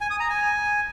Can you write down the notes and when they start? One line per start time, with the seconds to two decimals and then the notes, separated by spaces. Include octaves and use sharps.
0.01 G#5
0.10 D#6
0.20 A#5
0.30 G#5